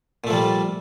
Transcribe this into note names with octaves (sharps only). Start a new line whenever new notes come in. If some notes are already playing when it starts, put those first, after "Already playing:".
A#2 F3 G3 A3